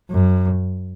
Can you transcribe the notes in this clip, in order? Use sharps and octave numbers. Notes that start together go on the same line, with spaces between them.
F#2